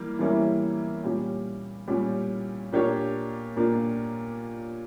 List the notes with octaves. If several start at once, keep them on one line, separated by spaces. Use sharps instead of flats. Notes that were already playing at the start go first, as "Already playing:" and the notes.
Already playing: E3 G3 A#3
E3 G3 A#3 C#4 E4
A#2 G3 C#4 G4
A#2 G3 C#4 G4
A#2 A#3 D4 G4 C#5
A#2 A#3 D4